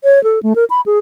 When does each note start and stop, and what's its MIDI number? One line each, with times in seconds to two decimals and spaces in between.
0.04 0.22 73
0.24 0.42 69
0.43 0.53 57
0.56 0.65 70
0.70 0.81 83
0.86 0.98 68